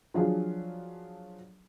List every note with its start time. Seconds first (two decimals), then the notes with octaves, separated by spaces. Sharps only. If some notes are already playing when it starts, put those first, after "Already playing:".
0.14 F3 F#3 D4 F4 G#4